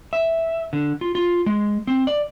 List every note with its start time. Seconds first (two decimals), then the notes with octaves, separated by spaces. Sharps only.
0.13 E5
0.73 D3
1.01 F4
1.15 F4
1.46 G#3
1.87 C4
2.07 D5